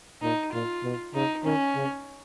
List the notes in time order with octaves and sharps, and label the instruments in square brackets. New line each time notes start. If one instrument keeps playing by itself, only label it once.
[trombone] A#2 [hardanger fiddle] D#4
[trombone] A#2 [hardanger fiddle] F4
[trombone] B2
[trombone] C#3 [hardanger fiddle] D#4
[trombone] D#3 [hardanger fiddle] C#4
[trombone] C#3